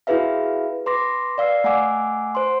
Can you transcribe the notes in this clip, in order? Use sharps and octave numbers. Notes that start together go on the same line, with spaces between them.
E4 F#4 G#4 B4 E5 F5
B4 C6 D6 A#6
D5 F5 E6 C7
A3 F#5 G#5 D6 E6
C5 C6